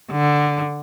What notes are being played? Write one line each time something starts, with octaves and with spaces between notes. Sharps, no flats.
D3